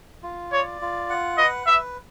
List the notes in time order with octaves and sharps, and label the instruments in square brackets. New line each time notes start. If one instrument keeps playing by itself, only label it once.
[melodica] F4
[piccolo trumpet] C#5 [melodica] D5
[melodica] F4
F#5
[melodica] B4 [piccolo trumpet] D#5
[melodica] B4 [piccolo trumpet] E5